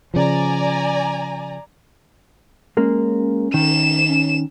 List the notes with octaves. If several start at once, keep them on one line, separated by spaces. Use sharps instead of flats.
C#3 F3 D5 G#5 A#5
G#3 A#3 C#4
D#3 E7
C#4